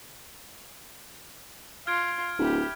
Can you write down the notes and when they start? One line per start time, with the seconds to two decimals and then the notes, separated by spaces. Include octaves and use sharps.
1.87 F4 F6 G#6 D7
2.39 D1 E4 G4